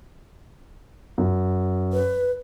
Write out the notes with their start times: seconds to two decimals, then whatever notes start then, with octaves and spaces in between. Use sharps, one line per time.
1.18 F#2
1.93 B4